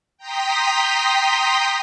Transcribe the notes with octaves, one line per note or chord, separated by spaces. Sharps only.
G5 A#5 C6 D#6 B6